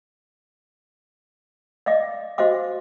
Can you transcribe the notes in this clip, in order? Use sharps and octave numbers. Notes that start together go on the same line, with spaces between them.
D5 D#5 F5 D6
F#4 C5 D#5 F5 D6